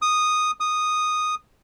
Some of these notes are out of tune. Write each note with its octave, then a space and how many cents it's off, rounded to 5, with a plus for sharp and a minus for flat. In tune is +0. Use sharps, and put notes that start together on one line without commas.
D#6 -10
D#6 -10